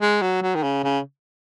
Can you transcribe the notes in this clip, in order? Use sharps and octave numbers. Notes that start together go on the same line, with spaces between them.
G#3
F#3
F#3
D#3
C#3
C#3